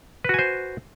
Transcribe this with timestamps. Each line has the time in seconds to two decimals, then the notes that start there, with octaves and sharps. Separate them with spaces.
0.24 B4
0.29 F#4
0.34 G#5
0.39 C5